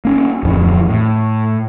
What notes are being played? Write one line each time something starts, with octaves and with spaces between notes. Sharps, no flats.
A#3 C#4
D1 F2 E3
A2